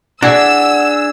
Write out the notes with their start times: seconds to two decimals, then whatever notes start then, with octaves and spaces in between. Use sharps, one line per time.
0.23 D4 F#4 G#4 D5 E5 E6